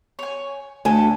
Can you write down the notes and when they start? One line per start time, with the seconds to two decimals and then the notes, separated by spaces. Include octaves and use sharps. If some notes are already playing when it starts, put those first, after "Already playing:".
0.19 C#5 G#5
0.85 D2 A4 G#5